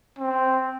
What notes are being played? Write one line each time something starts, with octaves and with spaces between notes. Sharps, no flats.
C4